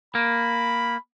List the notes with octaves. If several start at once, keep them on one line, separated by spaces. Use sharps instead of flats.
A#3 B5